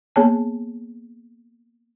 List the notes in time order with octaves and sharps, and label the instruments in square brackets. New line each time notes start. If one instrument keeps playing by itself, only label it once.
[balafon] A#3 B3 G#4 C#5 G#5 A5